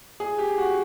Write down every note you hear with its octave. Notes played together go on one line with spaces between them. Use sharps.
G#4
G4
F#4